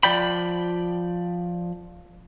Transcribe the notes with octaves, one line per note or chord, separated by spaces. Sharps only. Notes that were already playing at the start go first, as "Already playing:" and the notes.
F3 D5 G5 B5